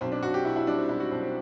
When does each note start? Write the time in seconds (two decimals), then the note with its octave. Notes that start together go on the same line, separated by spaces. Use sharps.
0.01 B1 C4
0.12 D4
0.23 B1 F#4
0.34 G4
0.45 B2 E4
0.56 E4
0.67 G3 D4
0.78 C4
0.89 B1 E4
1.00 F#4
1.11 B1 C4
1.22 C4